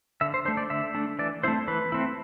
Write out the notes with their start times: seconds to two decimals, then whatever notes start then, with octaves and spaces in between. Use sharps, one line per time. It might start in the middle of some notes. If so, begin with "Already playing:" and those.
0.21 D3 E5
0.34 C5
0.45 A3 D4 C5
0.57 D5
0.70 D3 E5
0.95 A3 D4
1.19 E3 D5
1.43 A3 C4 E4 C5
1.68 E3 B4
1.92 A3 C4 E4